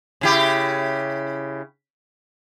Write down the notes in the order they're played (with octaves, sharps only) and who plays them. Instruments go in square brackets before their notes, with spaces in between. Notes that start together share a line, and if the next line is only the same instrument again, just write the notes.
[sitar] C#3 E4 G4